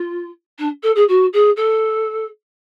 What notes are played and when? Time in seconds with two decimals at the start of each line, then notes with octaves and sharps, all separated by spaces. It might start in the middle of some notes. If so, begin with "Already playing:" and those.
Already playing: F4
0.58 D4
0.83 A4
0.95 G#4
1.08 F#4
1.33 G#4
1.56 A4